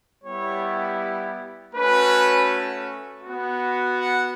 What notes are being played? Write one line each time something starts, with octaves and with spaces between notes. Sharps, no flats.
G3 B3 E4 G4 C#5
A3 C#4 F#4 B4
B3 F#4
F#5